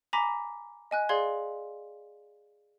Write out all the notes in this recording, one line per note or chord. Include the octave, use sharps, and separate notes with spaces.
G#5 A#5 B5 D6 A#6 B6
D#5 G#5 F#6
G#4 D5 F5 C6 G#6